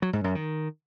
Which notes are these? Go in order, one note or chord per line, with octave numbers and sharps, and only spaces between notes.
F#3
G#2
F#2
D#3